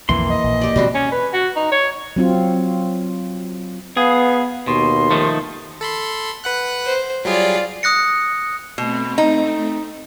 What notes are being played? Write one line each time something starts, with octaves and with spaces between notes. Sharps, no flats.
B1 F2 D#3 E3 A#3 C6
D#5
A#1
G4 D5
B2 D#3 G3 G#3 C4 F#4
C#4
B4
F#4
D#4
C#5
F#3 C4 F4
B3 G#4 F5
D#2 B2 C6
D#3 F3 A3
A4 B5 C6
B4 F#5 F#6
C5
F#3 G3 F4 G#4 D5
D#6 F#6 A#6 C#7
B2 A3 C4
D#4